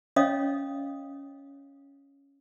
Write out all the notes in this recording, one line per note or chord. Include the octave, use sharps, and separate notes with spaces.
C#4 C#5 D#5 F5 D#6